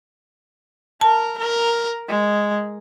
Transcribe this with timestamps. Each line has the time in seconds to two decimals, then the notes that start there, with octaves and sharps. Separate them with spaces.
1.01 A#4 A5
1.38 A#4
2.08 G#3